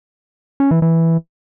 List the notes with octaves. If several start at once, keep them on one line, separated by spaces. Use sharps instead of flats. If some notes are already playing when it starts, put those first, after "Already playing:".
C#4
E3
E3